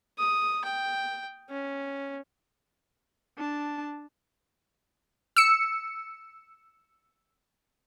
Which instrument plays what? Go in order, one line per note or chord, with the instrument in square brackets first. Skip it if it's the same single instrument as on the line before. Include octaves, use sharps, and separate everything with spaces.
[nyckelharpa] D#6
G5
C#4
[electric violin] D4 A5
[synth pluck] E6 C#7